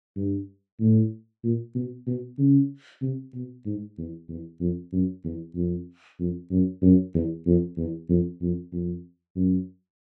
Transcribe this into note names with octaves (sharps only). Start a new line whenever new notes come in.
G2
A2
A#2
B2
B2
C#3
C3
B2
G#2
E2
E2
F2
F#2
E2
F2
F2
F#2
F#2
E2
F2
E2
F2
F2
F2
F#2